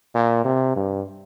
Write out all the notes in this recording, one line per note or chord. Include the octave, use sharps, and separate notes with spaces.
A#2
C3
G2